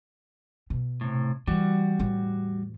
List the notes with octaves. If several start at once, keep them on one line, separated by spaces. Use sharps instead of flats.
B2
A2 C3
E3 G3 F#4
E2 A2